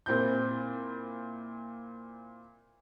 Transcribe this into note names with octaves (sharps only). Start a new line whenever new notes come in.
A#2 C4 E4 G6